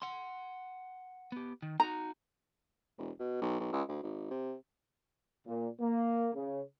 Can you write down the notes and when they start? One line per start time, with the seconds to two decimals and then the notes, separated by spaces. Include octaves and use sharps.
0.02 F#5 C6
1.32 B3 G4
1.62 D#3
1.80 D#4 F#4 A#5
2.98 E1
3.19 B2
3.41 B1
3.60 B1
3.72 C#2
3.88 D2
4.03 G#1
4.31 C3
5.47 A#2
5.80 A#3
6.34 C#3